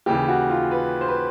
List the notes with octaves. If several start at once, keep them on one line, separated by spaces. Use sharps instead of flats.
D#2 C#3 E3 G4
F#4
F4
B4
C5
B4